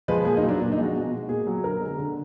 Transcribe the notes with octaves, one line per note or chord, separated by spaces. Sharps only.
F3 G#3 B4
A#2 G#4
D#4
F#3
D4
A#2 D4
D#4
F3 G#3
F#4
B2
G#3
A#2 G#4
F#3
D3 A#4
G#3
D3